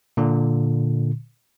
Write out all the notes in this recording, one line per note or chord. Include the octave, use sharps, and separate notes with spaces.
A#2 D3